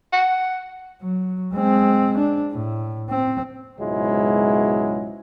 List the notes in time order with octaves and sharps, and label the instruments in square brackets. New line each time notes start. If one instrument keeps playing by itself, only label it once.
[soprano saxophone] F#5
[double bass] F#3
G#3 C4
D4
A2
C4
[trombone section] C#2 G#2 B2 F#3 G#3 E4